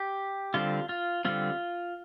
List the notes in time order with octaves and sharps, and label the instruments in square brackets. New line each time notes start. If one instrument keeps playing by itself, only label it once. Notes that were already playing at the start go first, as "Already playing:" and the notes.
Already playing: [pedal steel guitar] G4
D3 G3 C4 F4
F4
D3 G3 C4 F4